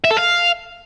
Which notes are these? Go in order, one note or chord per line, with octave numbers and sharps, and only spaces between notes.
E5
A4
F5